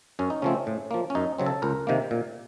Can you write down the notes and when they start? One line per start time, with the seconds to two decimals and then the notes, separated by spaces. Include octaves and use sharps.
0.19 F#2 C#4
0.30 D#4
0.42 C#3 F3 A3 C4 C#4
0.67 A2
0.91 F3 A#3
1.10 C#4
1.15 F#2 D#4
1.38 C#3 F#3 C4
1.46 A4
1.62 C#2 A#4
1.87 C3 D#3 A#3
2.11 A#2